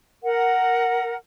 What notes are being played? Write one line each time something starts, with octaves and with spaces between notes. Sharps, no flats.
A#4 F#5